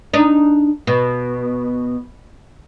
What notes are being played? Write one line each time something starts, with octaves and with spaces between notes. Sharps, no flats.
D4 D#4
B2